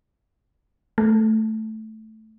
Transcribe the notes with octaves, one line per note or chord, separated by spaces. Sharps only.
A3